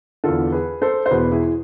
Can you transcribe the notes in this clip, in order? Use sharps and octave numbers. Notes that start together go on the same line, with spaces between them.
E2 D3 F4 A4
G#4 B4
A4 C5
C5
E2 B2 G#4 B4
E4 G#4